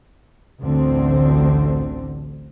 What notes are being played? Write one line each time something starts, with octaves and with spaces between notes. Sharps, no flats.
A1 D2 D3 C4